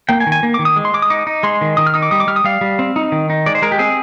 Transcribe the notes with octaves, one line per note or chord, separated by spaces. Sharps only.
A#3 G5
G#5
D#3
G#5
A#3
D6
D#3
D#6
G#3
C6
G#3 D6
D#6
D#4 D6
D#4
G#3 C6
D#3
D#3 D#6
F6
D#4 D#6
D6
G3 D#6
D6
G3 F6
D#6
G3 F5
G3
C4
D#4
D#3
D#4
G#3 D5
C5
G#3 A#4
G4
C4 G#4